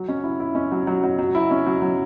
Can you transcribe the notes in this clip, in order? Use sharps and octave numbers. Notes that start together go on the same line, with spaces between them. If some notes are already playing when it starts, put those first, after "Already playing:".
Already playing: F#3
C#4
E4
E4
C#4
F#3
F#3
F#3
F#3
E4
C#4
F#3
F#3